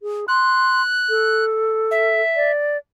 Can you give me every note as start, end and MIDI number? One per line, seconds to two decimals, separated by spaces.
0.03 0.25 68
0.28 0.82 84
0.28 1.45 90
1.09 2.21 69
1.91 2.51 76
2.36 2.77 74